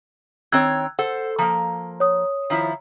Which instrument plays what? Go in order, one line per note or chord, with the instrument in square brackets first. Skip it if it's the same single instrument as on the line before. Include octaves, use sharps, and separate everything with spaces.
[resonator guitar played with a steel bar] D#3 C4 C#5 [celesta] E6 F#6 G#6
[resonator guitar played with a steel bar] A4 C5 [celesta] F#5
[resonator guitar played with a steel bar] F3 A#3 [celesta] A#5
[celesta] C#5 D#6
[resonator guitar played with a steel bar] D#3 F3 E4